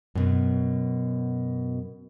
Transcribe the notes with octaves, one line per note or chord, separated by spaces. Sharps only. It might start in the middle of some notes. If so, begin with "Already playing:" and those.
F#2 B2